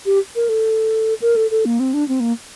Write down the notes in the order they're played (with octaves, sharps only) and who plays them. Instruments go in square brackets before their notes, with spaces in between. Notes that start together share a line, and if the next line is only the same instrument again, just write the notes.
[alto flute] G4
A#4
A4
A#4
A4
A4
A#3
C4
D4
C4
A#3